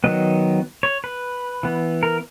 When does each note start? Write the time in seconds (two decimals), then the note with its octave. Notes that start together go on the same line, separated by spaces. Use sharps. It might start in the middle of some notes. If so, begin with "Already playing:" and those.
0.04 D#3 F#3 B3 D#5
0.83 C#5
1.04 B4
1.63 E3 B3
2.03 A#4